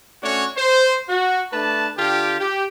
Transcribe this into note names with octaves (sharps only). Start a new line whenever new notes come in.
A3 C#4 D4 F#4 C#5
C5
F#4
A3 D4 B4 A5
D3 D4 F4 G4
G4